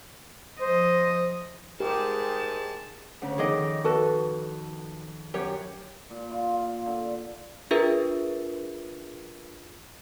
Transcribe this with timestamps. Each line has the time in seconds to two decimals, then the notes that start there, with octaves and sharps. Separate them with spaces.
0.61 F3 C5 D#5
1.80 G#2 G#3 G4 A#4 A5
3.22 D2 C#3
3.38 F2 D#3 G#4 D#5 D6
3.84 F#4 A4 B4
5.34 F#2 G4 C#5
6.10 A#2
6.31 F4
6.53 F5
6.87 D3
7.71 D4 F4 G#4 A#4 B4 E5